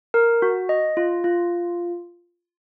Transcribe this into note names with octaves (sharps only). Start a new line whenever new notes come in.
A#4
F#4
D#5
F4
F4